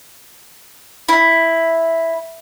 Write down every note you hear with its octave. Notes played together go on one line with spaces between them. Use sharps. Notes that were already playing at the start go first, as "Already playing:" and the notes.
E4